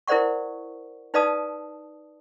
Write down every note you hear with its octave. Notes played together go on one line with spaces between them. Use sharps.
E4 A#4 C5 D5 F#5 C#6
D#4 B4 D5 F5 A5 D#6